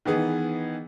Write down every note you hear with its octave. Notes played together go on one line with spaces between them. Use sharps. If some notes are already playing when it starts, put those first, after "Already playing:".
D#3 E3 B3 G#4